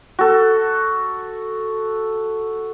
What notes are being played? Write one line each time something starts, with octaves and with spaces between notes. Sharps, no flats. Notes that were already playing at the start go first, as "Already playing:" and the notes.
F#4 A4